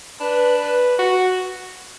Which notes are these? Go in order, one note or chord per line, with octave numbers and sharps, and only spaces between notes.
D4 B4
B4
F#4